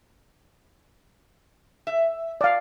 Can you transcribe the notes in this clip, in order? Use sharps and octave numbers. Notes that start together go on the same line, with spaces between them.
E5
D5 F5